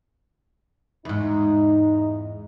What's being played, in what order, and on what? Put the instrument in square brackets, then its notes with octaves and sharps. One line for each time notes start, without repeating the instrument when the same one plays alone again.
[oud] E2 G#2 [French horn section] D#4